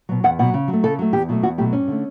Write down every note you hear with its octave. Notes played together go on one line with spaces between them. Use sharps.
B2 F#3
E2 F#5
B2 F#3 F#5
C#3
F#3
A3
C#3 A4
F#3 A3
E2 G4
B2 F#3 A3
E2 F#4
B2 F#3 A3 G4
G2 C#4
D3 A3